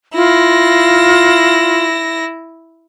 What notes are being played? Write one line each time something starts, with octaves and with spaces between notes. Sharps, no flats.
E4 F4 A#6